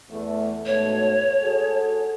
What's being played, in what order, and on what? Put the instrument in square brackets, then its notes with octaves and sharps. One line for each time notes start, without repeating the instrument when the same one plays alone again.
[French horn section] E2 A3
[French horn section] G#2 B2 A3 [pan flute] C#5
[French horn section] F#4 G#4 A4